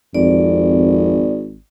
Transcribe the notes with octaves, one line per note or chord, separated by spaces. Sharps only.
G#1 F2 D5